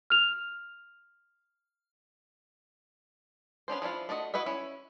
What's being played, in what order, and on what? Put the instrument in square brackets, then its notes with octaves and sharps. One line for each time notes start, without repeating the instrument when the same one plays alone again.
[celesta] F6 F7
[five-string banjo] B3 C#4 D4 C5
F3 D4 E4 F4
A3 D4 F#4 D#5
E4 F#4 B4 D#5 E5
C#4 E4